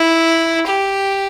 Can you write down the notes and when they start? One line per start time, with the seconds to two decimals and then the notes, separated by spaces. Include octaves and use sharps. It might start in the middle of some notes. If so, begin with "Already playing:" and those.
Already playing: E4
0.67 G4